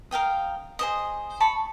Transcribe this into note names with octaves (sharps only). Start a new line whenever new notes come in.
A#4 F5 G5 D#6
G#4 C5 D#5
A5 B5 C#6